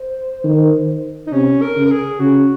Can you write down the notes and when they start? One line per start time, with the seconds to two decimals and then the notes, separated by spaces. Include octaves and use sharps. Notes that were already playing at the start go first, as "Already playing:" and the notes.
Already playing: C5
0.44 D#3
1.27 D#4
1.32 C3 C#4
1.62 A#4
1.76 C#3
1.86 A#4
1.92 G#4
2.20 C#3 F#4